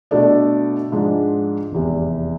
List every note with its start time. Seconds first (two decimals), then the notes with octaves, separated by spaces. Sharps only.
0.11 B2 A3 D4 A4 D5
0.92 G#2 F3 G#3 D4
1.72 F1 E2 C3